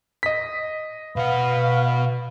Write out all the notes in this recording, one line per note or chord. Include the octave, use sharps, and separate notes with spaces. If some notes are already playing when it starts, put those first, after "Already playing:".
D#5 B6
B2 B4 F5 F#5